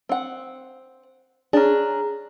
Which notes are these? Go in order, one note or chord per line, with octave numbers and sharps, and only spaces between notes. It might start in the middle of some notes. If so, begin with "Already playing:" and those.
C4 F#5
C#4 D4 G#4 A#5